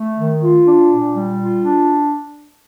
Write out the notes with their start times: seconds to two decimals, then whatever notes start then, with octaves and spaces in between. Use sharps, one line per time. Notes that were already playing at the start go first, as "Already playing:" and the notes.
Already playing: A3
0.17 D#3
0.41 F4
0.66 D4
0.90 A#2
1.14 G3
1.39 F4
1.63 D4